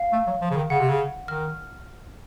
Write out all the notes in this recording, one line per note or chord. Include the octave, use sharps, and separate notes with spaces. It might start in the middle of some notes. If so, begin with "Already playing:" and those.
Already playing: F5
A3
F#3
F3
C#3
D#3
C#3 F#5
C3
C#3
D#3 F6